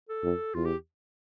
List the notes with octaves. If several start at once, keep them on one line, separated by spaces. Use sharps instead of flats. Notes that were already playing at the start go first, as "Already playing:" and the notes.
A4
F2
E2 F4
G4